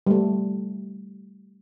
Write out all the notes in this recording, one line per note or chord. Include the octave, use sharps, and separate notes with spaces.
G3 A3